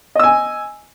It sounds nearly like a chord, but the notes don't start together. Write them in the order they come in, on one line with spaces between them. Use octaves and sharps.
D#5 E6 G#5